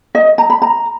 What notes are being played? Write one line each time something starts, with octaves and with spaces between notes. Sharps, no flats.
D#5
A#5
B5
A#5